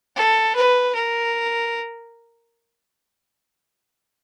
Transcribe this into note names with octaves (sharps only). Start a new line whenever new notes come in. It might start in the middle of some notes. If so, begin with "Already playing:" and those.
A4
B4
A#4